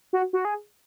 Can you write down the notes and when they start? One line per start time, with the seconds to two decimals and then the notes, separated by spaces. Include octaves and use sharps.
0.13 F#4
0.33 F#4
0.45 G#4